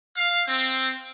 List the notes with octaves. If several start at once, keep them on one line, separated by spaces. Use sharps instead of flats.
F5
C4